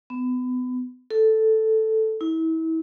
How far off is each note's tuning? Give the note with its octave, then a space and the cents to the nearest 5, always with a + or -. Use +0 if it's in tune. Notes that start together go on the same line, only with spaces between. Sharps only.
B3 +30
A4 +0
E4 -35